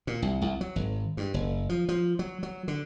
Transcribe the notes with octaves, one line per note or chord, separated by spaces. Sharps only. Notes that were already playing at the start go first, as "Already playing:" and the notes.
A#2
C2
C2
F#3
G#1
G2
F#1
F3
F3
F#3
F#3
D3